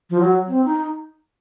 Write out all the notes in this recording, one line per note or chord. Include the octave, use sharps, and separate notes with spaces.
F3
F#3
C4
D#4